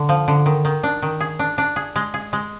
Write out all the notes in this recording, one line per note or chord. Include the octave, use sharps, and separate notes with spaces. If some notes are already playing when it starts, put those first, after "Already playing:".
Already playing: D3
F3
D3
D#3
D#3
D4
D#3
G#4
D4
D4
G#4
G#3
G#4
G#3